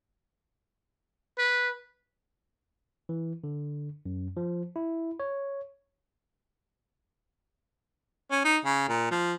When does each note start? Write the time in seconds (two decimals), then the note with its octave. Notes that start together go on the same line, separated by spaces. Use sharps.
1.38 B4
3.09 E3
3.44 D3
4.06 F#2
4.37 F3
4.76 E4
5.20 C#5
8.32 C#4
8.45 D#4
8.65 C#3
8.89 A#2
9.11 F3